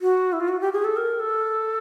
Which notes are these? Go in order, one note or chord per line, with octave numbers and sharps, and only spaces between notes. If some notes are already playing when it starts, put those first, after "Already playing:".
F#4
E4
F4
F#4
G4
G#4
A4
A#4
A4